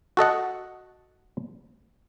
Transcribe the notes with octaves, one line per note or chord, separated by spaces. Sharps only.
F#4 A4 D#5 F#5